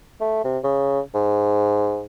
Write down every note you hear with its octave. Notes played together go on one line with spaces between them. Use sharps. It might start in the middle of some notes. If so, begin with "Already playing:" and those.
A3
C3
C#3
G#2